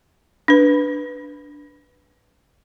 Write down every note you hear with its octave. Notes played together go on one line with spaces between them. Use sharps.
D4 B4